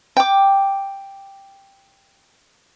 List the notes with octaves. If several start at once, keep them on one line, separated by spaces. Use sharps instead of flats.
G5 D6